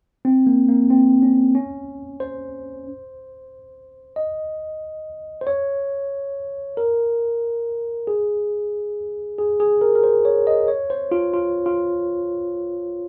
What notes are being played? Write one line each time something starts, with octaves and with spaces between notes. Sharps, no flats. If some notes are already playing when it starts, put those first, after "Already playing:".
C4
A#3
A#3
C4
C#4
C#4
C5
D#5
C5
C#5
A#4
G#4
G#4
G#4
A#4
A#4
C5
C#5
D#5
C#5
C5
F4
F4
F4